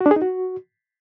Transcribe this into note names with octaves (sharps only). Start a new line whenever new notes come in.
F#4
D4
G#4
D#4
F#4